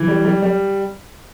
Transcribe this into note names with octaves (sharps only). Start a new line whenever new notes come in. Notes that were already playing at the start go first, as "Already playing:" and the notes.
Already playing: E3
G3
G3
G3